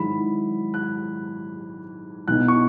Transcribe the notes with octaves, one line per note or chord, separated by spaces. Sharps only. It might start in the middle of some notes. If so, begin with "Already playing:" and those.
Already playing: G#1 G#2 F#3 E4 B5
F#6
B1 B2 F#3 B3 E4 F#6
C#6